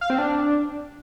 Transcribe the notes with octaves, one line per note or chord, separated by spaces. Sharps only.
F5
C4
D4